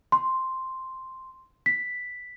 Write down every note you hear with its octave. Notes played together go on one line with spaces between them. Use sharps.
C6
B6